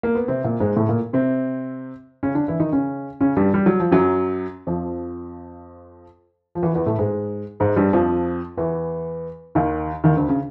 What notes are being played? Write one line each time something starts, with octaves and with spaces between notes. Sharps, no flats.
A#3
B3
C3 C4
A#2 A#3
G#2 G#3
A2 A3
A#2 A#3
C3 C4
C#3 C#4
D3 D4
E3 E4
D#3 D#4
C#3 C#4
C#3 C#4
G2 G3
G3
F#3
F3
F#2 F#3
F2 F3
F3
E2 E3
E2 E3
A2 A3
G#2 G#3
G#2 G#3
G2 G3
F2 F3
E2 E3
D#2 D#3
D#2 D#3
D2 D3
C#3